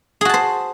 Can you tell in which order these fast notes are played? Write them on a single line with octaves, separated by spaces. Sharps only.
G#4 F#4 A5 C5